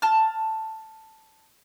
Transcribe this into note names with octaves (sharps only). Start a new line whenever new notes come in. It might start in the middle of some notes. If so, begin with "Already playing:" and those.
A5 F6